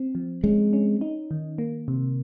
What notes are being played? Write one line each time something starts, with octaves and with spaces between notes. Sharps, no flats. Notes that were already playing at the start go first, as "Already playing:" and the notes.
Already playing: C4
F3
G#3 C#4
C#4
D#4
D#3
A#3
C3